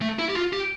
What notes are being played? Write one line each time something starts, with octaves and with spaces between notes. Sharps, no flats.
A3
E4
G4
F4
G4